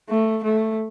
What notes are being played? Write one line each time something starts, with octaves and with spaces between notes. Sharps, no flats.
A3
A3